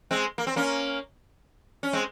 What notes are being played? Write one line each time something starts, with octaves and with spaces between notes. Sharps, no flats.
G#3 C4
A#3
C4
A#3 C#4
C#4
G#3 C4